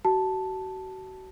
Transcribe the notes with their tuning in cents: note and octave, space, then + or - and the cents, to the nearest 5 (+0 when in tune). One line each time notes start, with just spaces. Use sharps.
F#4 +35 A5 +0